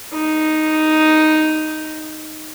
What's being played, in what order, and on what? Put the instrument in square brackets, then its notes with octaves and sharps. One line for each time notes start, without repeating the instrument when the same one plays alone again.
[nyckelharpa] D#4